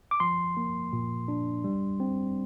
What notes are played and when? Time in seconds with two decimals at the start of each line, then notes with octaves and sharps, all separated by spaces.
0.11 D6
0.20 F3 C6
0.57 A#3
0.93 A#2
1.28 D4
1.64 G3
2.00 C4